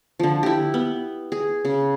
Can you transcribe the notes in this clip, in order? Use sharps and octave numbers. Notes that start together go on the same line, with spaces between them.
D3 F3
E4 G4
B3
G#4
C#3